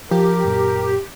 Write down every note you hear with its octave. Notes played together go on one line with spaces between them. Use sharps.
F3 G4 A#4
F#2 A#2